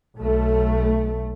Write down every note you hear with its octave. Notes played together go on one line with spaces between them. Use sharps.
B1 A3